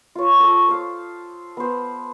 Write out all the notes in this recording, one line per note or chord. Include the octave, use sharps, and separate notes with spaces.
F4 C#5
A4 C#6 D#6 E6
C5 F5
B3 C5